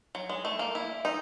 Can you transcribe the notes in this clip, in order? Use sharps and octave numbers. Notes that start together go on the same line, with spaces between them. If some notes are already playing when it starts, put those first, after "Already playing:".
F#3
G#3
A3
A#3
E4
D#4